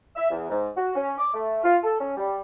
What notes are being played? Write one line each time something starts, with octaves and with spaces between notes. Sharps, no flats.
E5
E2
G#2
F#4
C#4
D6
A3
F4
A4
C#4
G3